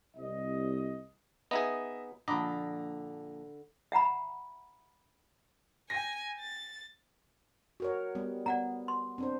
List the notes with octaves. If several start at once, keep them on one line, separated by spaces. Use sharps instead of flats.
C2 D#5
B3 D#4 G#4 D#5 E5
A#1 D3 D#5 A#5 B5 D6
E5 F#5 A#5 B5
G5 G#5 A#6
A6
F#4 A#4 C#5
G3 B3
B3 D5 F#5 A#5
C6
C4 D4 C5